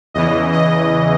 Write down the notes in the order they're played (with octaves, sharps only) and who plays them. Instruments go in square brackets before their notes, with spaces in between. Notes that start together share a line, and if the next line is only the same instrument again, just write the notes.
[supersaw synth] E2 C#3 E3 D#5
D#5